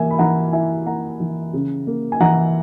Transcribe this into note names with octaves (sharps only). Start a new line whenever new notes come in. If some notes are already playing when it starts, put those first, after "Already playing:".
Already playing: E3 A#3 E5 G#5
B5
E3 F#5 A#5
E4 E5 G#5
A#3 F#5 A#5
E3
C#3
A#3
G#5
E3 F#5 A#5